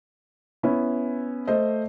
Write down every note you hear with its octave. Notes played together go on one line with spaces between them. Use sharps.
B3 C#4 E4
A3 C5 D#5